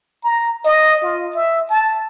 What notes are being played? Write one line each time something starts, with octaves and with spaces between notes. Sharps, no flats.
A#5
D#5
F4
E5
A5